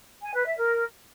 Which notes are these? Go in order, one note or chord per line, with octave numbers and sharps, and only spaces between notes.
G#5
B4
E5
A#4